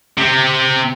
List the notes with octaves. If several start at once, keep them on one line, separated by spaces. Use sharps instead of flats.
C3 C4